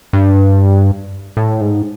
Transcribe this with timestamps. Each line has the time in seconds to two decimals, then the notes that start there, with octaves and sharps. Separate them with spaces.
0.13 G2
1.37 A2
1.61 G#2